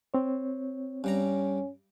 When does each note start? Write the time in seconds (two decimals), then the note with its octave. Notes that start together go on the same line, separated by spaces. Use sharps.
0.14 C4 C#5
1.04 G2 G3 C#4 A#5